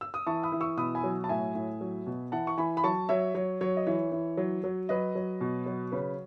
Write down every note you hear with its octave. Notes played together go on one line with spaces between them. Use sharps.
E6
D#6
E3 A5 C#6
B5 D#6
E3
C#6 E6
B2 B5 D#6
G#5 B5
F#3
A5
A2 E5 G#5
A2
F#3
B2
E3 F#5 A5
C#6
E3 G#5 B5
B5
F#3 A5 C#6
F#3 C#5 E5
F#3 C#5
F#3 C#5
D#5
E3 C#5
E3
F#3
F#3
F#3 B4 D#5
F#3
B2
F#3
C#3 B4